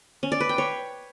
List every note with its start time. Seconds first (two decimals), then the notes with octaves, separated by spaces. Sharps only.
0.23 C#4
0.32 D5
0.40 B4
0.49 G5
0.58 C#5